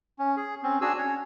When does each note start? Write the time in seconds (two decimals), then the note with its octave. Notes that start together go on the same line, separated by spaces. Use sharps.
0.19 C#4
0.37 G#4
0.63 C4 C#4
0.81 D4 F#4 G#4 G#5 E6
0.98 C#4 C#5